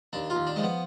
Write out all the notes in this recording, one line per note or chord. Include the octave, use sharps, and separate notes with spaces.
D#2 D4
F4
D#2
D4
F3 G#3
B3